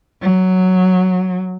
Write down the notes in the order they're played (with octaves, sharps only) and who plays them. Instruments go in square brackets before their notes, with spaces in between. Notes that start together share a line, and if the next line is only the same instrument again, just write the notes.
[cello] F#3